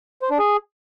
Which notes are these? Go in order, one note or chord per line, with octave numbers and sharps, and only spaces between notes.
C5
D4
G#4